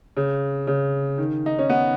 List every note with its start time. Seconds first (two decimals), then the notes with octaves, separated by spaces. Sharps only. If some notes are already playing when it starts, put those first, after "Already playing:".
0.17 C#3
0.67 C#3
1.18 D#3
1.46 D#4
1.58 C#4
1.69 B3